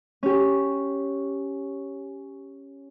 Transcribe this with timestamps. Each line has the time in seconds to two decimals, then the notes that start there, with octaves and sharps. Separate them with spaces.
0.23 C#4 G4